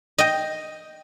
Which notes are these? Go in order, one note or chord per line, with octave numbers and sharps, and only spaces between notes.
D#5 G5